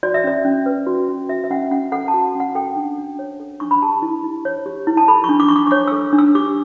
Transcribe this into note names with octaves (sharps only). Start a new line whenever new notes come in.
F#4 D5
E5
C#4 D5
C#4
B4
F#4
C#4
F#4 E5
E5
C#4 F#5
C#4 F#5
A4 F#5
A5
F#4
C#4
F#5
A4 G5
D4
D4
C#5
A4
D4 C#6
B5
G4 A5
E4
E4
C#5
G4
E4
A5
A4 B5
C#6
D4
D6
D4 C#6
D6
C#6
C#5 D6
A4 E6
D4
E6
G4 D6